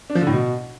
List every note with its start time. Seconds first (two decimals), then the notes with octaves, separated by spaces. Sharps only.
0.10 D4
0.15 F3
0.21 D3
0.27 A2
0.32 B2